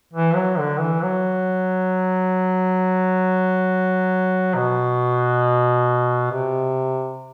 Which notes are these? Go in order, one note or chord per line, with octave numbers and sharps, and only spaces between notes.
E3
F#3
D3
E3
F#3
B2
C3